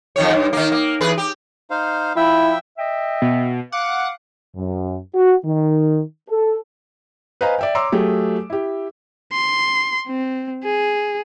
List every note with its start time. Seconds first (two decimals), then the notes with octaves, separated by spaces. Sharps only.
0.16 F2 D#3 C#5
0.33 G2
0.53 D#3 A#3
0.72 A#3
1.01 E2 G#4 B4
1.18 G4
1.70 D#4 C5 F5
2.16 F3 E4 E5 G5 B5
2.78 D#5 E5 G5
3.22 B2
3.72 F5 F#5 D6
4.56 F#2
5.15 F#4
5.44 D#3
6.29 A4
7.41 B4 C5 D#5 F5 G#5 A#5
7.59 D5 E5 G5
7.75 C#5 A#5 C6 D6 E6
7.92 F#3 A3 G4 G#4
8.50 E4 G4
9.33 C6
10.08 C4
10.64 G#4